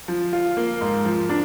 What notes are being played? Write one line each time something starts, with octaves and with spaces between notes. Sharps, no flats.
F3
F4
A#3
G#2
F3
D4